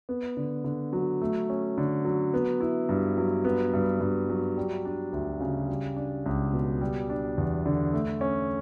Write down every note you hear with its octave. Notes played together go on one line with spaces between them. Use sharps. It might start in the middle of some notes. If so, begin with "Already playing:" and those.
B3
D3
D3
F#3
A3
C#4
D3
F#3
B3
E4
G2
F#3
B3
G2
G2
F#3
G3
D4
D2
C#3
G3
D4
C#2
B2
G3
D4
E2
D3
A3
C#4